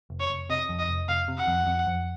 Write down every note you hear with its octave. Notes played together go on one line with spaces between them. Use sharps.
F1
C#5
F1
C3 D#5
F2
D#5
F1
F1 F5
C3
F#5
F2
F2
F2